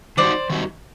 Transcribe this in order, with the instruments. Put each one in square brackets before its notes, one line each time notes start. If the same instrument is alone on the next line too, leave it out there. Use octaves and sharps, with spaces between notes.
[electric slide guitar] D#3 G3 C4 D#4 F#4 [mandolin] C5 D5
[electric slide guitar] D#3 G3 C4 D#4 F#4